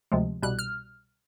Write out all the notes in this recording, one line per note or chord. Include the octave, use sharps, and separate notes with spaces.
D2 C3 F3 G#3
C2 B2 G3 F#6
F6